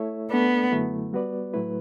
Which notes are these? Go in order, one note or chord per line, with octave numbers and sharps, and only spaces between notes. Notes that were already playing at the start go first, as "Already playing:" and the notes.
Already playing: A3 E4 A4 C#5 E5
A3 B3 D4 A4 D5
F#2 D3 F#3 A3 E4
G3 B3 F#4 B4 D5
A2 F#3 A3 E4 B4